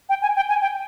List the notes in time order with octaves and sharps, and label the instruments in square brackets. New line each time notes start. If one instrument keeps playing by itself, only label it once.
[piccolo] G5
G#5
G5
G#5
G5